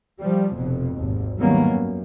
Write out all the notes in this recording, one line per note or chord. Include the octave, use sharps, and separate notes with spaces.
F3 G3
F1 F2 B2
G#1 D#2
D#3 F#3 G3 A#3 B3 C#4
F#2